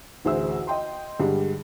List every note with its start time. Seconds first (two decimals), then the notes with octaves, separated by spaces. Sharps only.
0.25 A1 D2 G#4 C5 E5 E6
0.67 D#5 G5 C6
1.20 G2 D3 G3 G#3